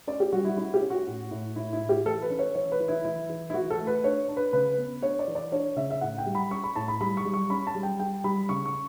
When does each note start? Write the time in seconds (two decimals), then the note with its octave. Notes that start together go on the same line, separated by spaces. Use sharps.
0.07 C#4 D5
0.20 G4
0.32 G3 F#4
0.45 E4
0.57 C#4 E4
0.74 G4
0.82 C#4
0.90 F#4
1.07 A2
1.31 A2
1.56 A2 E4
1.73 E4
1.81 A2
1.89 G4
2.06 E3 A4
2.22 B4
2.30 C#4
2.39 C#5
2.55 E3 C#5
2.72 B4
2.80 E3
2.88 E4
3.05 E3 E4
3.29 E3
3.50 E4
3.54 E3 F#4
3.70 A4
3.79 A3
3.87 B4
4.04 D4 C#5
4.28 D4
4.37 B4
4.53 C#3 B4
4.78 B3
5.02 D4 C#5
5.19 D5
5.28 E3
5.35 D5
5.52 D4 C#5
5.76 C#3 E5
5.91 E5
6.01 A2 F#5
6.18 G5
6.26 G3
6.35 B5
6.51 C#4 C#6
6.64 B5
6.76 A2 A5
6.88 B5
7.01 G3 B5
7.17 C#6
7.25 G3
7.34 C#6
7.50 C#4 B5
7.67 A5
7.75 G3
7.83 G5
8.00 G3 G5
8.24 G3 B5
8.49 C#3 C#6
8.66 C#6